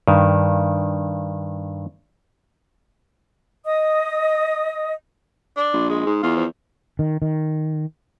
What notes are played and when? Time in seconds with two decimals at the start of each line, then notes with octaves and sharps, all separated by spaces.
0.08 G2 D#3
3.65 D#5 D#6
5.57 D4
5.73 A#1
5.90 G#3
6.06 G#2
6.23 E2 F4
6.36 F3
6.99 D#3
7.22 D#3